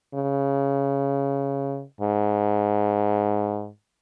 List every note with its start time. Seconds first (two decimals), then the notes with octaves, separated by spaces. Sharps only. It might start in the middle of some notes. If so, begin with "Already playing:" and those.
0.15 C#3
2.01 G#2